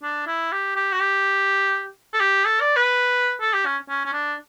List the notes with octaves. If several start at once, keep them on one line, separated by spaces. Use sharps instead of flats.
D4
E4
G4
G4
F#4
G4
A4
G4
A4
D5
B4
A4
G4
C#4
C#4
C#4
D4